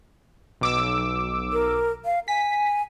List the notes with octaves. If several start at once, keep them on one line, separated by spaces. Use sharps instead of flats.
B1 D6 E6
A#4
F5
G#5 B6